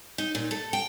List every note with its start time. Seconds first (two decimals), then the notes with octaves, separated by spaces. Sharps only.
0.18 D#4
0.35 A#2
0.51 A4
0.73 G5